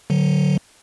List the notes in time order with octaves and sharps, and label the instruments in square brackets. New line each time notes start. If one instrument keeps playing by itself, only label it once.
[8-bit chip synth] D3 F#3